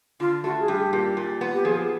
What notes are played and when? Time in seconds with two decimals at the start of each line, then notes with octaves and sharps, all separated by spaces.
0.20 D3 F4
0.44 A3 F#4
0.60 G#4
0.68 G2 G4
0.93 A#2
1.17 A#2
1.41 B3
1.54 G4
1.65 F3 G#4